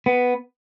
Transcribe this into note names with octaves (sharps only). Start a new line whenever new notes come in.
B3